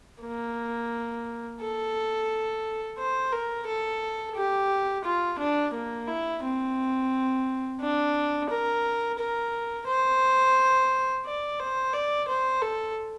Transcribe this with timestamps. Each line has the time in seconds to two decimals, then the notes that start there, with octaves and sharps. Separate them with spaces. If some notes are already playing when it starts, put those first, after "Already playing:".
0.22 A#3
1.61 A4
2.98 C5
3.32 A#4
3.67 A4
4.35 G4
5.04 F4
5.39 D4
5.74 A#3
6.07 E4
6.42 C4
7.80 D4
8.49 A#4
9.19 A#4
9.87 C5
11.25 D5
11.60 C5
11.93 D5
12.28 C5
12.62 A4